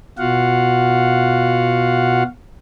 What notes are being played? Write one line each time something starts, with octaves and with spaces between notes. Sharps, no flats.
B2 F4 F#4 F5 F#5